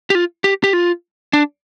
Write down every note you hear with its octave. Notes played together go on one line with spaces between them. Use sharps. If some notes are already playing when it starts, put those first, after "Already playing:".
G4
F4
G4
G4
F4
D4